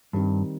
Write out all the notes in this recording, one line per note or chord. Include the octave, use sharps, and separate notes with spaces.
G2 D#3 G3 C4 D#4